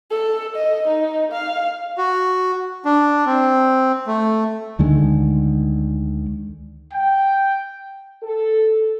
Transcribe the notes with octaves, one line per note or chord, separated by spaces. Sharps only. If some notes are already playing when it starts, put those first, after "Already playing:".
A4
D#5
D#4
F5
F#4
D4
C4
A3
D2 D3 D#3 G#3
G5
A4